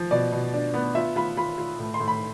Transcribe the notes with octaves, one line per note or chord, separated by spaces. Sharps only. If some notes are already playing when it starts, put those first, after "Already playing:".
Already playing: F3
B2 D5
B2
D4
B3
F4 E5
F4 B5
F4 B5
F4
A2
C6
A2
B5